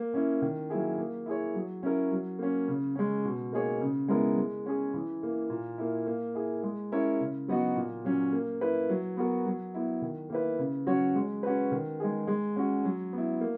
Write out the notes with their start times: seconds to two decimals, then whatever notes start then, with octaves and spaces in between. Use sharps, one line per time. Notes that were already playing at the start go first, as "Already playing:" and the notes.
Already playing: A#3
0.14 C#4 E4
0.42 D#3
0.70 F#3 A#3 E4 G#4
0.98 A#3
1.26 E4 G#4 C#5
1.55 F#3
1.83 C#4 E4 A#4
2.12 F#3
2.39 A#3 C#4
2.68 C#3
2.96 G#3 C#4
3.25 B2
3.53 A#3 D#4 G#4 C#5
3.81 C#3
4.08 G#3 B3 E4 A#4
4.37 G#3
4.66 C#4 G#4
4.94 E3
5.22 A#3 E4
5.50 A#2
5.78 A#3 E4
6.07 A#3
6.34 E4 G#4
6.63 G#3
6.92 C#4 E4 A#4 C#5
7.20 C#3
7.48 F#3 B3 D#4 F#4
7.76 A#2
8.05 F#3 C#4
8.33 A#3
8.61 E4 B4
8.89 F#3
9.17 B3 F#4 A#4
9.46 F#3
9.74 B3 E4
10.02 D#3
10.30 A#3 E4 B4
10.59 C#3
10.87 F#3 C#4 F#4 C#5
11.15 G#3
11.43 C#4 F#4 B4
11.72 D#3
12.00 G#3 D#4 G#4
12.27 G#3
12.56 C#4 F#4
12.85 F#3
13.13 B3 E4
13.41 A#3